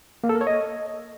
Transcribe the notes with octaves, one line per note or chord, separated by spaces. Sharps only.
A#3
A4
A#4
C#5
D#5